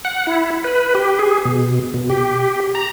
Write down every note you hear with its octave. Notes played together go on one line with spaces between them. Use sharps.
F#5
E4
B4
G4
G#4
B2
B2
G4
A#5